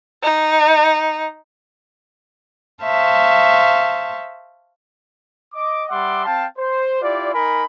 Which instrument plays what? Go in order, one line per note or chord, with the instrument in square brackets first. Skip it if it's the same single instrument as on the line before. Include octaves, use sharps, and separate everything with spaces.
[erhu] D#4
[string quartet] C5 E5 F5 A5 C#6
[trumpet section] D#5 D6
G3 E5 F#5 C6 D6
C4 F5 G5 A5
C5
E4 F4 G4 D5
D#4 A#4 G#5 B5